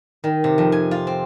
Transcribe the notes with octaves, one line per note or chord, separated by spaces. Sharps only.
D#3
C3
F2
G#5
F4
C4